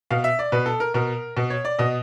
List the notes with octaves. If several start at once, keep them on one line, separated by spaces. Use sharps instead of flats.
B2 F5
E5
D5
B2 B4
A4
A#4
B2 A#4
B2
C#5
D5
B2 D#5